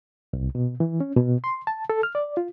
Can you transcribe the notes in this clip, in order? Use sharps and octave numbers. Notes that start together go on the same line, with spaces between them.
C2
B2
E3
C#4
B2
C6
A5
A4
F6
D5
F4